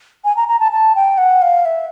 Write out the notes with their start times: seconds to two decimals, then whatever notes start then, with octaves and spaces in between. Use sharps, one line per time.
0.25 G#5
0.37 A#5
0.48 A#5
0.60 A5
0.72 A5
0.95 G5
1.18 F#5
1.42 F5
1.65 E5